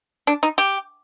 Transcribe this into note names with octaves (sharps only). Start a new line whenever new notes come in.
D4
D#4
G4